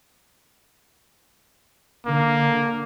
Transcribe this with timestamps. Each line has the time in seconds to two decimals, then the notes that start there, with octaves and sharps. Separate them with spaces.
2.06 D3 A#3